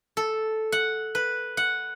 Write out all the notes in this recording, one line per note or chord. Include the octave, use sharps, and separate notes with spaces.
A4
F#5
B4
F#5